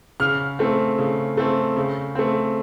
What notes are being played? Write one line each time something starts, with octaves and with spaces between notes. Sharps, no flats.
C#3 F6
A3 C4
C#3
A3 C4
C#3
A3 C4